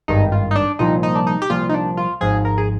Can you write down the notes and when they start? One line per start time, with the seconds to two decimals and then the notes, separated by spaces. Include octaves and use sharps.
0.08 G#1 G2 D#3 D#4
0.32 F4
0.51 D#4
0.56 D4
0.79 C2 A#2 F3 D#4
1.03 D#4
1.15 D4
1.27 D#4
1.42 G4
1.50 C2 A#2 F3 F4
1.69 D#4
1.74 D4
1.97 F4
2.21 G#1 G#2 F3 G#4
2.45 A#4
2.58 G#4